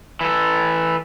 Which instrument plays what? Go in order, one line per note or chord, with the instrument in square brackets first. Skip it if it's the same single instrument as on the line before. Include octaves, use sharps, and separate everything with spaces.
[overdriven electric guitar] E3 A4